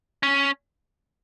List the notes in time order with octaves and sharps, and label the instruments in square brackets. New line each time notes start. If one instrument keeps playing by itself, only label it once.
[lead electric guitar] C#4